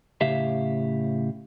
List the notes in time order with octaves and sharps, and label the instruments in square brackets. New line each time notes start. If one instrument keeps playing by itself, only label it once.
[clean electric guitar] A2 C#3 G4 E5 F5